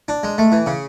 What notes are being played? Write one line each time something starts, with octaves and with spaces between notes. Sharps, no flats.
D4
G#3
A3
E3
C#3